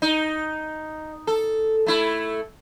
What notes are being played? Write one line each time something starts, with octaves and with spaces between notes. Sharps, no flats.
D#4
A4
A3 E4